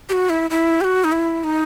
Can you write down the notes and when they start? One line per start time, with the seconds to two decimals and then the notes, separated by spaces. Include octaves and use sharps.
0.09 G4
0.13 F#4
0.30 E4
0.50 E4
0.81 G4
0.84 F#4
1.04 D#4
1.12 E4
1.44 D#4